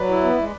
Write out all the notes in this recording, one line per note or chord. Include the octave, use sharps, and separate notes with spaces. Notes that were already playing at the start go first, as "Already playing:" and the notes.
Already playing: F#3 B4 D5
E4
B3
G#3